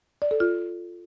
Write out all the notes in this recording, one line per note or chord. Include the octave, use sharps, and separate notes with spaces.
D5
A4
F4